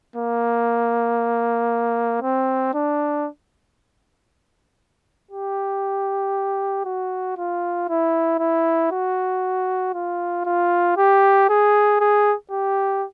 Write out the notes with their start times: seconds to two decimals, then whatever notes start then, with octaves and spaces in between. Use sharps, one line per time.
0.16 A#3
2.22 C4
2.74 D4
5.31 G4
6.85 F#4
7.37 F4
7.89 E4
8.39 E4
8.91 F#4
9.94 F4
10.45 F4
10.97 G4
11.49 G#4
12.00 G#4
12.51 G4